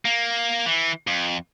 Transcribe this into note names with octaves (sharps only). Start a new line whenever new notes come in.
A#3
E3
F2